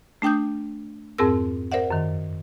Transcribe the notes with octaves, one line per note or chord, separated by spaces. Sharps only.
A3 D4 G5 D#6 G6
F2 G#2 C4 G#4 A#4 E6
A#4 C5 D5 E5 F#5
F#2 D#3